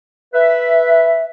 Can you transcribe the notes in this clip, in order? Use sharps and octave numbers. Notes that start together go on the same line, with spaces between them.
B4 E5